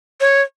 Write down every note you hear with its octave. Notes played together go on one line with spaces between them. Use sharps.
C#5